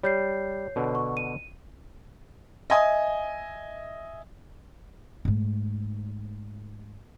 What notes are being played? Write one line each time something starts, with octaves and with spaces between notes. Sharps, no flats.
G3 C#5 G6 C7
B2 D3
C#6
D#7
D#5 E5 G#5 D#6
G#2 A3